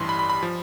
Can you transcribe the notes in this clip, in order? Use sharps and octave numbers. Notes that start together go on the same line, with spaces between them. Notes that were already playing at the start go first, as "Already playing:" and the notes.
Already playing: A1 G2 E3 C6
B5
B5
B5
F3